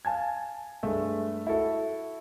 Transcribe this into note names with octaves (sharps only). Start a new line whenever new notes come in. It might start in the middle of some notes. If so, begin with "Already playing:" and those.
F5 G#5 A5 G#6
G2 G#3 A3 E5
E4 F#4 A4